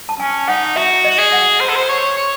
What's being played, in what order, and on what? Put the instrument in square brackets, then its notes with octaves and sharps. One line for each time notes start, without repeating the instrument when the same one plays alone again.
[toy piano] A5
[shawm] C#4 [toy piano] G#5
[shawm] D#4 [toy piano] F#5
[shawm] F#4 [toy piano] E5
[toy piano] D#5
[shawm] F#4
G#4
[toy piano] F#5
[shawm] C5
A4
C5
C#5
C#5